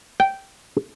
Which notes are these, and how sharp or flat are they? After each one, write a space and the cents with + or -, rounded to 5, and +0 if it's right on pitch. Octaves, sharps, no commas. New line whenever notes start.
G5 -10